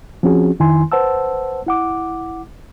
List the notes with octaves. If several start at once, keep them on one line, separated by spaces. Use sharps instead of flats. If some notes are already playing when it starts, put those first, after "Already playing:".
F3 C4 C#4 F#4 G#4
F2 D#3 E4 G#5 C6
B4 C5 F#5 A5 E6
E4 F#5 D6